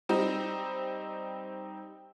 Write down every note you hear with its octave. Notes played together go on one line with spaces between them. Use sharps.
G3 C4 D#4